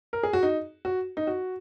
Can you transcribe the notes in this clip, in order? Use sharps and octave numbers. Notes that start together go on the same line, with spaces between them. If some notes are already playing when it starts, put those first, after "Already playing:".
A#4
G#4
F#4
D#4
F#4
D#4
F#4